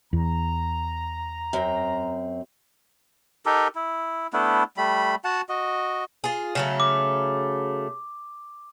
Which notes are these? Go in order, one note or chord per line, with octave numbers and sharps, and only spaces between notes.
E2 A#5
F#2 C4
D#4 G4 A4 A#4
E4
A3 B3 D4 E4
G3 A3 B5
F#4 F#5 A5
F#4 D#5
F4 G#4
C#3 F#3 A3
D6